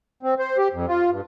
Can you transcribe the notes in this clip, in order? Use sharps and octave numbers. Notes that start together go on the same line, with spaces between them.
C4
C5
G4
F2
F4
G2